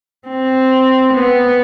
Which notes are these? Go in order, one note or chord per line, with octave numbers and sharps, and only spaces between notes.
C4
B3